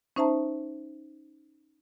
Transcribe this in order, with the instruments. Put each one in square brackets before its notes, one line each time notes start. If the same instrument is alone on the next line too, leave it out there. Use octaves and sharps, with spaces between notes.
[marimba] C#4 D#4 C5 E5 A5 A#5